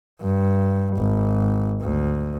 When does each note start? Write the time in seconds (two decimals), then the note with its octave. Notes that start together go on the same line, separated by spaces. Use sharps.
0.22 G2
0.96 G#1
1.82 D2